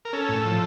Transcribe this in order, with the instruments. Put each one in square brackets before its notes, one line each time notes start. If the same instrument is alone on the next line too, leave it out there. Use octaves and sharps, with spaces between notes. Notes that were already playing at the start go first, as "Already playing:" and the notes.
[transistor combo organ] A#4
C#4 A4
A2
F3